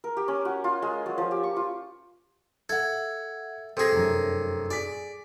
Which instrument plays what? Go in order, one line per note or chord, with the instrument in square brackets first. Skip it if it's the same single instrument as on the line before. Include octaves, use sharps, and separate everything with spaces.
[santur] A#4
G4
C#4
F#4
F4
G#3
F#3
F3
G4
C#6
F4
[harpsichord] A4 [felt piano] E5 F#5 [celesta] G#6
[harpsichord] C3 G#4 [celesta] A4 [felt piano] C5 A#6
[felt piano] F1 F#2
[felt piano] G#4 B6 [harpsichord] D5